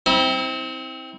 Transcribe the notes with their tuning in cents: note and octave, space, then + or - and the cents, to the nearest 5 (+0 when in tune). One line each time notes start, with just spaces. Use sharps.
C4 +0 E4 -40